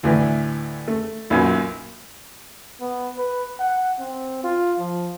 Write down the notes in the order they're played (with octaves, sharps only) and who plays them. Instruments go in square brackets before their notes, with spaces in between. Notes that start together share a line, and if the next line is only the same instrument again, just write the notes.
[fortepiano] D2 A2 E3
A3
B1 F#2 A#2
[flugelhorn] B3
B4
F#5
C4
F4
F3